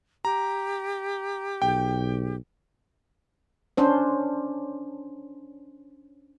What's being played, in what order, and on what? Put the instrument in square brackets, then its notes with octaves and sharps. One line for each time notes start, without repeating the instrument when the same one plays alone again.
[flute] G4 [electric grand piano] A#5
[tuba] B1 [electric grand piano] G5
[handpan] C#4 D4 C5